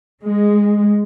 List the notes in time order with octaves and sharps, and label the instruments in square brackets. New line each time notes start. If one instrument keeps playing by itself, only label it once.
[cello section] G#3